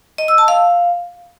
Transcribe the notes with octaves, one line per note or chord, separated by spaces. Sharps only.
D#5
E6
A5
F5